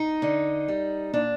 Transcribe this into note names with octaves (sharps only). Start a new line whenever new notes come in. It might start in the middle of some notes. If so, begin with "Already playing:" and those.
Already playing: D#4
D3
G3
A#2 D4